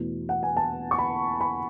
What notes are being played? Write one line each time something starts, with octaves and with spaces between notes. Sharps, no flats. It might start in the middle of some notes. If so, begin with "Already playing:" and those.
Already playing: E2 B2 A3
F#5
G#5
A5
C#6
B5
B5